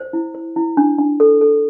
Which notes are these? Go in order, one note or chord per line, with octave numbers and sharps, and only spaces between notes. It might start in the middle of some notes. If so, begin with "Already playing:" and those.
Already playing: C5
E4
C5
E4
D4
D4
A4
A4